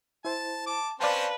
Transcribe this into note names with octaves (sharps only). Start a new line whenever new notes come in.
E4 C5 A5
A5 D6
C4 C#4 B4 C5 D5 F5 A5